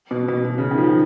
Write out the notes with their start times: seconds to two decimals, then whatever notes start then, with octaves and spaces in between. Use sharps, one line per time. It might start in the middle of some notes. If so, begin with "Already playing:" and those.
0.11 B2
0.28 B2
0.45 B2
0.58 C#3
0.71 D#3
0.78 F3
0.84 D#3